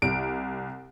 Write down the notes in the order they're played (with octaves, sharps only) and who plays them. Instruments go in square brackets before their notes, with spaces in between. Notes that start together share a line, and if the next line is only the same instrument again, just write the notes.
[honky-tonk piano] C2 D7